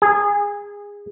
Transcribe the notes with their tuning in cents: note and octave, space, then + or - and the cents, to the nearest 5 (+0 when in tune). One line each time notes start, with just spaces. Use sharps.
G#4 -20